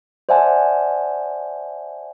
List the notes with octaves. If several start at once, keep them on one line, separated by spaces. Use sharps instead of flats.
C5 D5 E5 F#5 G#5 A5